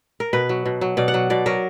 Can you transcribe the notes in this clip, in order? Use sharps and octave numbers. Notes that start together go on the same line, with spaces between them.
A#4
B2 B4
F#3
B2
F#3
B2 D5
F#5
F#3
B2 D5
F#3 A#4